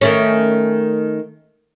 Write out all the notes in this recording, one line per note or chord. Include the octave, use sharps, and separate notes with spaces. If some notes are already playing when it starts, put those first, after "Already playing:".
D#3 A3 C#4